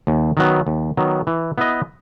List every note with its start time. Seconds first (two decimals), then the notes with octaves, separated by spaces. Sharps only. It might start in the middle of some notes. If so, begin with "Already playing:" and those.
0.07 D#2
0.37 D#3 F#3 B3
0.67 D#2
0.97 D#3 F#3 B3
1.27 E3
1.58 B3 E4 B4 D#5